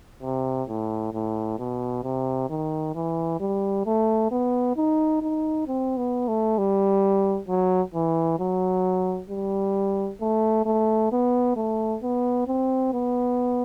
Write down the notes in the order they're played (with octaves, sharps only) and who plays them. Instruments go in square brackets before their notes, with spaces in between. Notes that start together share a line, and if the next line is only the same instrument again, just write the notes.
[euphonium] C3
A2
A2
B2
C3
D#3
E3
G3
A3
B3
D#4
D#4
C4
B3
A3
G3
F#3
E3
F#3
G3
A3
A3
B3
A3
B3
C4
B3